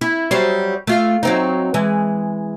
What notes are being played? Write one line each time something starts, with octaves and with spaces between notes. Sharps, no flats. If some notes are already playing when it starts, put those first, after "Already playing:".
E4
F#3 G3 C5
A3 F4
F#3 C4 D#4
E3 G#3